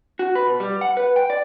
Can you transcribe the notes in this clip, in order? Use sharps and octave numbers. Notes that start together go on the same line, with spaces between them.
F#4
B4
B2
G3
F#5
B4
G5
D5